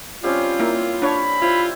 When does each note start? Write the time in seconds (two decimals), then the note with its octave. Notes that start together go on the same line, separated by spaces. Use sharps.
0.24 G3 C4 C#4 F4
0.59 A#3 E4
1.02 D4 C#5 B5
1.42 E4 F4 C5 E5